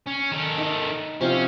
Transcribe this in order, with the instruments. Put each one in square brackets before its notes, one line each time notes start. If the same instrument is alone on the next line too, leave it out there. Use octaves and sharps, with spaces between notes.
[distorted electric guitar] C#4
D#3 A4
[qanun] D#4 E5
[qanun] C3 F3 F5 [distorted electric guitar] C#4